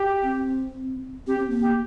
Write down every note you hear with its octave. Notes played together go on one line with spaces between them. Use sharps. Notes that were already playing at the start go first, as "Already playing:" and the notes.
Already playing: G4
C4
C4 G4
C4
A#3
G4